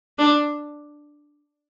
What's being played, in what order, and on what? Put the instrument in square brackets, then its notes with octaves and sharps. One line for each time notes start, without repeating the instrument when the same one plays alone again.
[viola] D4